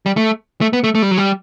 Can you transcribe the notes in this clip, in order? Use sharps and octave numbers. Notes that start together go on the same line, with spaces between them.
G3
A3
A3
B3
A3
A3
G3
F#3
G3